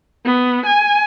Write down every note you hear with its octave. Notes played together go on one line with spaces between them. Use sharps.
B3
G#5